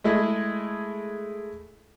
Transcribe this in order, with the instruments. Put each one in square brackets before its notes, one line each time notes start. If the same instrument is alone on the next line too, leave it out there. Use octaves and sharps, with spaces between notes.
[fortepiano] G#3 A3 E4 G#4 D#5